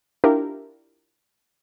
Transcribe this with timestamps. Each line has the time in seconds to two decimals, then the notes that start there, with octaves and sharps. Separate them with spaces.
0.24 D4 E4 F4 G4 A#4